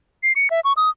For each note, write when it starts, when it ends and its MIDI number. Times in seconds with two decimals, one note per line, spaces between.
0.23 0.32 96
0.36 0.50 97
0.50 0.60 76
0.65 0.73 85
0.77 0.89 87